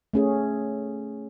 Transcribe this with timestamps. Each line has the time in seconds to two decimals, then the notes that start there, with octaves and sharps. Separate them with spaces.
0.13 A3 C#4 G#4